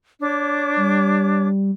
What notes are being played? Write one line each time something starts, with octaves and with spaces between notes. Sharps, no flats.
D4 C#5 D6
G3